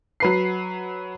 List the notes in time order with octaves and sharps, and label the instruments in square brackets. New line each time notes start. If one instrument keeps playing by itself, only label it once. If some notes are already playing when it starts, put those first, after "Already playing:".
[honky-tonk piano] F#3 B4 C7